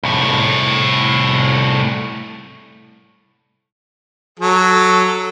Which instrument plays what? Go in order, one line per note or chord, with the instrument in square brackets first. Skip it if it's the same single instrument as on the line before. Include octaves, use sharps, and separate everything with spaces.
[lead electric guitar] C2 A2
[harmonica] F#3 A4